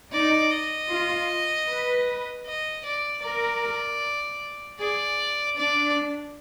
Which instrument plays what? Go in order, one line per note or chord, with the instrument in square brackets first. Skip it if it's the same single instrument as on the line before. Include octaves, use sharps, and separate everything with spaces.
[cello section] D#4 [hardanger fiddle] D5
[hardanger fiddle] D#5
[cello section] F4
B4
[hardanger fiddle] D#5
D5
[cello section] A#4 [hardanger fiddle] D5
[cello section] G#4 [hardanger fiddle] D5
[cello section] D4 [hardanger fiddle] D5